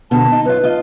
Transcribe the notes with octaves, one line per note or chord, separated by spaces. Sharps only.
B2 D3 A5
D#4
F#2 F4 B4
F4 D#5